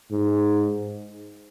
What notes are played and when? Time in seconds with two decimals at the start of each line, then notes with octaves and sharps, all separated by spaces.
0.11 G#2